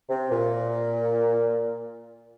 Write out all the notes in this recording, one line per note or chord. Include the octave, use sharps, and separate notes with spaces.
C3
A#2